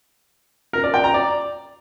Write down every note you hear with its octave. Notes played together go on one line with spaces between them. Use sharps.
A#4
D5
G5
A#5
D5